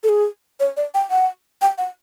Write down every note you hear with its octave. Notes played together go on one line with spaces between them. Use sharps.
A4
G#4
C#5
D5
G5
F#5
G5
F#5